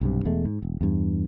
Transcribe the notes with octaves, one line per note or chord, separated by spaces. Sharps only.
B1 G2 C3
E1 E2 G#3 A3
G#2
E1
E2 G2